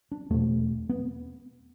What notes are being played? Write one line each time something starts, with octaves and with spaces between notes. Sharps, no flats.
D4
E2 B2 A3
B3